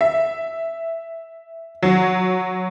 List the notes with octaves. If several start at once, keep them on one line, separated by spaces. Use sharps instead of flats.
E5
F#3